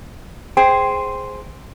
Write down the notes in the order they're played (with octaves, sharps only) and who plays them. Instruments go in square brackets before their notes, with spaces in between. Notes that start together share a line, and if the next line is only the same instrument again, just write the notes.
[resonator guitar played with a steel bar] G#4 C5 [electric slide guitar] G5